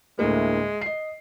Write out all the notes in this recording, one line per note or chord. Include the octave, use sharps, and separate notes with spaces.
D2 A2 G#3 A#3
D#5 C7